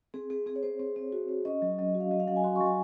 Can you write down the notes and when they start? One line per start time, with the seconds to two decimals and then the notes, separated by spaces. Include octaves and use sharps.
0.14 C4 G#4
0.30 C4 G#4
0.46 C4 G#4
0.56 C#5
0.63 C4 C5
0.80 C4
0.96 C4
1.12 F#4
1.29 C4
1.45 C#4 D#5
1.62 F#3
1.79 F#3 D#5
1.95 F#4
2.00 F5
2.11 F#3 D#5
2.20 F5
2.27 F#3 F#5
2.36 G#5
2.44 F#4 C6
2.56 F#3 C#6
2.66 G#5